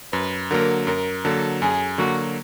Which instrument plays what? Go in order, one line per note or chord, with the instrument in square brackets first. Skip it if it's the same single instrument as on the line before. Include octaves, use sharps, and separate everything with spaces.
[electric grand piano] F#2 [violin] B4
[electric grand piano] D3 F#3 A#3 [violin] A#4
[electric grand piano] F#2 [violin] A#4
[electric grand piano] D3 F#3 A#3 [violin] A4
[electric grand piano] F#2 [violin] G#4
[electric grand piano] D3 F#3 A#3 [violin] F#4